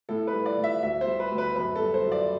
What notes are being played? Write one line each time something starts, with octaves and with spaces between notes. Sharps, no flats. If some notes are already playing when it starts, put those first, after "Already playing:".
A2 A4
B4
G3
D5
A2
E5
D2 E5
C5
G3
B4
D2
B4
F#2 B4
G3 A4
C5
F#2
D5